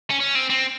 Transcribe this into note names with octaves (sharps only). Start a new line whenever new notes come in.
C#4
C#4
C4
C4